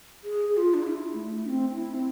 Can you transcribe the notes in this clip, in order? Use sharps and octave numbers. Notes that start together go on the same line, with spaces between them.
G#4
G#4
F4
D4
F4
E4
A3
D4
C4
E4
C4